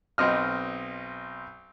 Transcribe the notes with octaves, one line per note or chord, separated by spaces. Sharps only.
B1 C4 D#5 F6